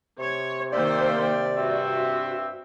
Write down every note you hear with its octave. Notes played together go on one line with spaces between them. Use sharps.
C3 C#5
D#3 A#3 C5 D5 E5 F5 G5
G2 C4 F#4 E5